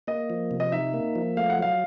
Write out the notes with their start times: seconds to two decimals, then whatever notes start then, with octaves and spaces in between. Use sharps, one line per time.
0.08 A#3 D#5
0.30 F3
0.51 C3
0.60 D#5
0.72 D#4 E5
0.94 A#3
1.15 F3
1.37 A3 F5
1.50 F#5
1.59 F#3 F5